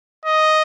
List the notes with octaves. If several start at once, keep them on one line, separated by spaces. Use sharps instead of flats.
D#5